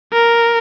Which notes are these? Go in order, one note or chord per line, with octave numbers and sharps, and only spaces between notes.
A#4